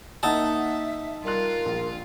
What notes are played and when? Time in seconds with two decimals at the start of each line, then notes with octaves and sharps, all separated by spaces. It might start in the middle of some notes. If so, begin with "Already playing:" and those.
0.23 A#3 D#4 E5 F#5 A5 E6
1.24 G3 F4 A#4 F#6
1.66 A#1